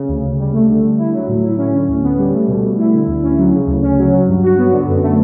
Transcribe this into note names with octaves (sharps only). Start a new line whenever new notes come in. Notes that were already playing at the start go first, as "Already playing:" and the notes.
Already playing: C#3
D2
D2
G3
A3
D3
D3
E4
F#3
A2
E4
C#4
D3
D2
B3
G3
A3
B2
B2
E4
D3
D2
C#4
F#3
C#3
D2
C#4
F#3
F#3
G2
F#4
B3
D3
F#2
A3